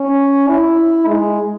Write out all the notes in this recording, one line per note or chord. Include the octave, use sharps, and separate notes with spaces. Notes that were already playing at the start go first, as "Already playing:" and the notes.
Already playing: C#4
E4
G#3